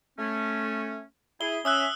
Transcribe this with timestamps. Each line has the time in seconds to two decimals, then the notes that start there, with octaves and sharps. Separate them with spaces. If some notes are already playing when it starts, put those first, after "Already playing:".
0.19 A3 C#4
1.41 E4 G#4 G7
1.65 C#4 E5 D#6 E6 F#6